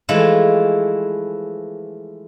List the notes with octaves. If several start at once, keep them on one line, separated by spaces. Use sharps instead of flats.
E3 F3 G#3 A3 E4 F4